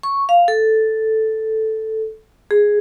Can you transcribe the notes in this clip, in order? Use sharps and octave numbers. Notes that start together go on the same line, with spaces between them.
C#6
F5
A4
G#4